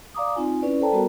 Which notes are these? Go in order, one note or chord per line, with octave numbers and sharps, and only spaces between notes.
D5 F5 A#5 D6 D#6
C4 D#4 F4 G#5
C#4 E4 B4 D5
A4 C5 D5 G5 A5 A#5
G3 B3 F#4 A#4